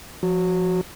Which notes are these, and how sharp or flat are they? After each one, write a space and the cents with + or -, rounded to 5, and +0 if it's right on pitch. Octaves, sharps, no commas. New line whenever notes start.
F3 +0 F#4 +0